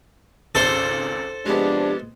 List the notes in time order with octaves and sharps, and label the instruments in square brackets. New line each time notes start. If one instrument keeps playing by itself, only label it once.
[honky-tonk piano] G#1 C#2 [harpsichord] A4 C5
[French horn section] C3 F3 D4 [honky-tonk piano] G#3 B3 [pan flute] G4